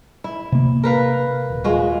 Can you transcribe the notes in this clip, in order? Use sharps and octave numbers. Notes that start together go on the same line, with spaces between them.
E4
C3 A#3
A#4 B4 F5
D#1
G#3 F4 F#4